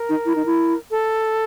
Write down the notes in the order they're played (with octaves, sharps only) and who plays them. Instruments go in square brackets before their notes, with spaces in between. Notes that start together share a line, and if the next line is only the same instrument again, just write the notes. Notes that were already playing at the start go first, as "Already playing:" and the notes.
Already playing: [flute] A#4
[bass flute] D#4
E4
D#4
E4
[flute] A4